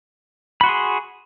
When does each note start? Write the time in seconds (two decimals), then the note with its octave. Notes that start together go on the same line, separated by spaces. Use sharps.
0.61 B5
0.64 F#4
0.66 C6
0.69 G#4